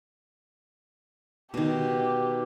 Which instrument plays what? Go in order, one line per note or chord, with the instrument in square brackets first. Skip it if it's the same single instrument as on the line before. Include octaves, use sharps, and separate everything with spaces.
[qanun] B2 D#3 [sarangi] G4